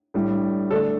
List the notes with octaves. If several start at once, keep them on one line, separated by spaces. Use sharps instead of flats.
A2 G3 D4
D3 A3 D4 A4